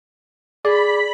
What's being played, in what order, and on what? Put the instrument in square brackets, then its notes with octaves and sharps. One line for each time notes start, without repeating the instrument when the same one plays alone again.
[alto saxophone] G#4 [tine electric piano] D5 [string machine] B5